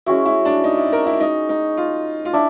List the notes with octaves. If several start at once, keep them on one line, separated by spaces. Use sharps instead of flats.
G#3 C#4 E4 F#4
E4
D4
D#4
E4
A#4
E4
D#4
D#4
F4
F4
D4 E4